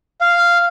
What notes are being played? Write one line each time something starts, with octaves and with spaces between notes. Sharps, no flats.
F5